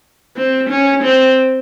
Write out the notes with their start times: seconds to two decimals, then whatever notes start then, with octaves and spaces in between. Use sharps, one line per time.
0.37 C4
0.70 C#4
1.04 C4